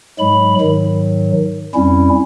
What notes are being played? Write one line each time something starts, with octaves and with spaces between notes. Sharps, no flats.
G#2 F#3 G#3 B5
G#2 D#3 F#3
F2 G3 C#4 E4